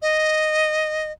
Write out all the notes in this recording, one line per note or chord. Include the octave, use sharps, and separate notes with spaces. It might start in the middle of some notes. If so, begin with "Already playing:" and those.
D#5